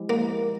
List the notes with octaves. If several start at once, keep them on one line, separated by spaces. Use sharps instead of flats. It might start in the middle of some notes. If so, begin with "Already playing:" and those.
Already playing: F3 G#3 E4 G4
A#3